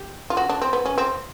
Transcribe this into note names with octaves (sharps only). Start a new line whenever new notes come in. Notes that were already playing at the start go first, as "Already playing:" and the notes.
Already playing: G4
F4
F#4
D4
C4
B3
C#4
C4